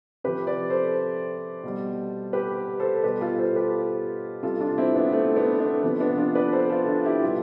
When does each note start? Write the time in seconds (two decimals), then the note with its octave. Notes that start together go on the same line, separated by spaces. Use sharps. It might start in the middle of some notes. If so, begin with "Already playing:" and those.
0.24 C3 F3 G4 B4
0.47 B4 D5
0.70 A4 C5
1.63 B2 G3
2.33 G4 B4
2.80 A4 C5
3.03 B2 G3 G4 B4
3.21 F4 A4
3.38 A4 C5
3.56 G4 B4
4.43 C3 G3 F4 A4
4.61 D4 F4
4.78 C4 E4
4.95 B3 D4
5.12 A3 C4
5.36 B3 D4
5.60 B3 D4
5.83 C3 F3 B3
6.00 B3 D4
6.18 D4 F4
6.35 B4 D5
6.53 A4 C5
6.70 F4 A4
6.87 D4 F4
7.05 E4 G4
7.22 B2 G3 F4 A4